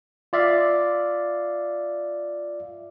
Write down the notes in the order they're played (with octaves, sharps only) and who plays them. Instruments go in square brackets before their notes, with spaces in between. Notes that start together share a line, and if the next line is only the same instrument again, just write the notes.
[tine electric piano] F4 D5 E5 F5